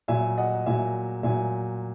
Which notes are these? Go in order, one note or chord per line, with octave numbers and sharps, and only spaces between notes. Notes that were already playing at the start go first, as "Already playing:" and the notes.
A#2 F#3 E5 G#5
D#5 F#5
A#2 F#3 E5 G#5
A#2 F#3 E5 G#5